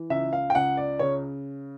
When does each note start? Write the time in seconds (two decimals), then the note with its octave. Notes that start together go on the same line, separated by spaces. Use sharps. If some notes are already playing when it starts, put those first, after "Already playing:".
Already playing: E3
0.10 C#2 E5
0.33 F5
0.50 G5
0.55 C#2 F#5
0.77 D5
0.99 C#3 C#5